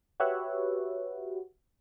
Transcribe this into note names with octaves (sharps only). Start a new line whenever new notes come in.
F#4 G4 B4 C#5 E5 F#5